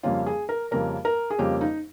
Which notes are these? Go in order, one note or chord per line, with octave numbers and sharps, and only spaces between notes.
F2 C#3 G3 A#3 C#4 F4
G#4
A#4
F2 C#3 G3 A#3 C#4 A#4
A#4
G#4
F2 C#3 G3 A#3 C#4 G4
D#4